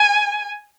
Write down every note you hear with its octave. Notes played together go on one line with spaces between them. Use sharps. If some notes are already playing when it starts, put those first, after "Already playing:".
Already playing: G#5